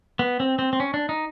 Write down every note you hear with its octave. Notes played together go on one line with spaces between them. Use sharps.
B3
C4
C4
C4
C#4
D4
D#4